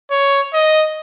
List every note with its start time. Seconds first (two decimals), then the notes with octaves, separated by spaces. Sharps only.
0.11 C#5
0.54 D#5